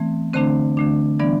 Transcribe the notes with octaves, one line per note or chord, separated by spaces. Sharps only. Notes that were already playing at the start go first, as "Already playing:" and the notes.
Already playing: E3 A3 B3 C4
D3 A3 C4 D4 C5
D3 A3 D4
E3 G3 B3 D4 D5